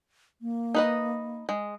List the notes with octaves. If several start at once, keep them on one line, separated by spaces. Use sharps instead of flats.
A#3
D#4 B4 D#5
G#3